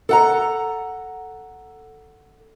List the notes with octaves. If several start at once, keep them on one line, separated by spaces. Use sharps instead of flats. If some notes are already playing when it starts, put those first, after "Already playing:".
A4 F#5 A#5